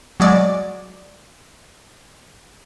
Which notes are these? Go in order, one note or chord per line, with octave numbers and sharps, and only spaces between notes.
F#3 G#3 D5